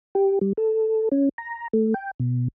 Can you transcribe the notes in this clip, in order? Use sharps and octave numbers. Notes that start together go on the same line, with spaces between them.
G4
G3
A4
C#4
A#5
A3
G5
B2